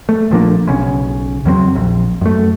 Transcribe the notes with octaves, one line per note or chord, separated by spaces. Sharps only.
A3
A#1 F3 A#3 D4
B1 C#3 C#4
E2 F#3 G#3 C4
A#1
F#2 A3